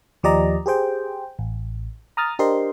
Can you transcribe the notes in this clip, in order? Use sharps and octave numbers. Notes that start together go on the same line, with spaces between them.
D#2 F3 G4 D5 D#5 A#5
G4 G#4 C5 G5
A1
A#5 D#6 F6 A6
D4 G4 A#4 C5 D#5 C6